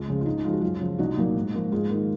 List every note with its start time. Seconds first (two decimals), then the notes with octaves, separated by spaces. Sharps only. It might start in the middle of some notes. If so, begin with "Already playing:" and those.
Already playing: C#2 F4
0.08 C#3 F3 G#3
0.21 F4
0.26 G#2 D#4
0.44 F3 G#3 F4
0.53 F#4
0.61 F#2 F4
0.81 C#3 F3
0.99 C2 D#4 F#4
1.17 A#2 F#3 A#3
1.36 G#2
1.54 F3 A#3
1.71 G#2 F4 G#4
1.90 D#3 A#3